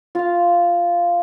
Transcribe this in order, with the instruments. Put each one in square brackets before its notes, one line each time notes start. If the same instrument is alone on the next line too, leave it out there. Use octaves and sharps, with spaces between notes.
[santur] F4 F5